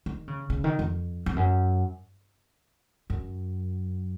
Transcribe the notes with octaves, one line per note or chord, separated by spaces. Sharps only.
D#3
C#3
C#3
D#3
F2
F2
F#2
F#2